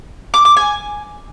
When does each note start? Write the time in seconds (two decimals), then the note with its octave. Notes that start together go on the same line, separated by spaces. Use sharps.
0.34 D6
0.45 D6
0.57 G#5